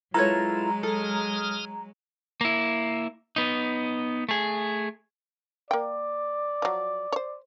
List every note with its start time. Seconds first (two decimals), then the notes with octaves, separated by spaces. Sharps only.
0.14 F#3 G#3 E4 F4 A4 B4 C#5 A#5
0.83 A4 D#6 F6
2.41 A#3 E4
3.36 B3 D#4
4.29 A3 G#4
5.71 A#3 D5 G5
6.62 F3 F#3
7.12 C5 C#5